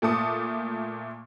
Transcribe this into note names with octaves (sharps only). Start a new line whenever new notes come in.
A#2 A3 A5 D6 D#6 C#7